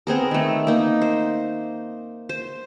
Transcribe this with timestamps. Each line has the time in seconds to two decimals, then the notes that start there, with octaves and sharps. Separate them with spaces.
0.07 B3 C4 G#4 A#4
0.31 D#3 A3
0.67 A#3 D#4
1.02 C5
2.29 C5